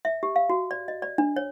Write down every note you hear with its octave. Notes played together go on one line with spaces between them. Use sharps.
E5
G4
F5
F#4
D5
D#5
D5
D4
C#5